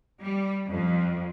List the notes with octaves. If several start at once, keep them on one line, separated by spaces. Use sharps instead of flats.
G3
F2